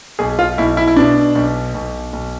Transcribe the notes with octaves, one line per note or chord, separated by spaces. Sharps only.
B1 G#4
F4
B1 E4
E4
E4
B2 D4
B1
B1
B1